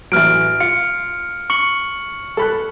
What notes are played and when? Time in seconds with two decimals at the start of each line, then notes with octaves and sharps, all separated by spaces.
0.12 A1 E3 F#3 F6 D7
0.60 F4 C#7
1.50 C#6 C#7 F#7
2.37 A4 B5 F#6